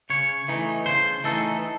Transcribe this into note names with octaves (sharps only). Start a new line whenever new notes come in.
C#3 C#5
E3 A3 D#4
C#3 C5
E3 A3 D#4 A4